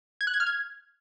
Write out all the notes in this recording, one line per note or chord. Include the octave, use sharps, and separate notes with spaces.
G#6
F#6
G#6
F6
G#6